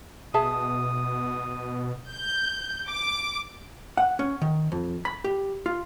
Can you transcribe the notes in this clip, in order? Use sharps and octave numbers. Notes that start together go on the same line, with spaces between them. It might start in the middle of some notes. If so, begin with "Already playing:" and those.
B2 G#4 E5 A5 D#6
G6
D6
F#5
C#4
D#3
F2
B5
G4
F4